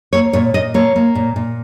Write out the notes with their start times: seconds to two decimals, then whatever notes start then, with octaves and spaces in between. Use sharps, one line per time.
0.13 A#3 C#5
0.33 A#2 C#5
0.54 A#2 D#5
0.74 A#3 C#5
0.96 A#3
1.15 A#2
1.36 A#2